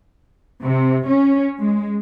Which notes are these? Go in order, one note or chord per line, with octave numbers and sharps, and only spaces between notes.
C3
C#4
G#3